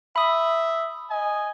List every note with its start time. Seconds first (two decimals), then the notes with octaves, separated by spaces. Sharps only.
0.16 E5 B5 D#6
1.10 D#5 G#5